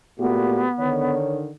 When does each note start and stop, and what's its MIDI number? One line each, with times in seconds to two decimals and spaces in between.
0.19 0.67 46
0.19 0.66 57
0.19 1.16 59
0.19 0.66 66
0.19 0.66 67
0.79 1.50 50
0.79 1.50 51
0.79 1.38 73